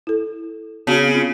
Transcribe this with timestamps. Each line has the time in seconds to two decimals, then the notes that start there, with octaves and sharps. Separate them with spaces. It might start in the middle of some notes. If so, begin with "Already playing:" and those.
0.07 E4 A4
0.87 C#3 B3 C4 F#4
1.13 C#4 F4